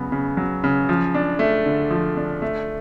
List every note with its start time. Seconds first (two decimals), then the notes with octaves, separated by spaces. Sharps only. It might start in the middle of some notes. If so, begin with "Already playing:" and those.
Already playing: C#3 F#3 B3
0.12 C#3
0.37 F#3
0.64 C#3
0.89 F3
1.14 D4
1.39 A3
1.66 D3
1.90 F3
2.17 D4
2.42 A3